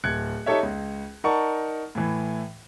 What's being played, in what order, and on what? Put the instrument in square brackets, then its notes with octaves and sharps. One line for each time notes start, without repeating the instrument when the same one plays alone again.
[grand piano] D1 F#6 G#6 C#7
D#4 G4 A4 C#5 E5
C#2
D#4 A#4 D5 F#5 A5 C#6
A2 E3